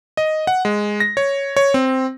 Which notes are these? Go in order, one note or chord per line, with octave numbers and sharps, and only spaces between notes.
D#5
F#5
G#3
A#6
C#5
C#5
C4